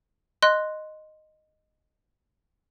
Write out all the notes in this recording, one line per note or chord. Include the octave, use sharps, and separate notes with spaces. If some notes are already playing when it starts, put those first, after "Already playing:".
D#5 C6 F#6